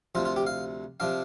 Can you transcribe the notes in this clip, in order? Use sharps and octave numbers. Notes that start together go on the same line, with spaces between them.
D2 C3 F3 F4
F4
G4
F5
C3 F3 D4 F5